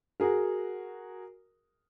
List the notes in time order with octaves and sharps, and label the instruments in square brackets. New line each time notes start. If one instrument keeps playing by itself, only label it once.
[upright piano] F#4 G#4 A#4